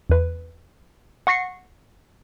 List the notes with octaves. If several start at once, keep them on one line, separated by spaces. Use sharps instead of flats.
E2 B4
F#5 C#6 A#6 C7 C#7